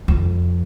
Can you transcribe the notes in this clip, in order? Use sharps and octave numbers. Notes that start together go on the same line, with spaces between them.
F2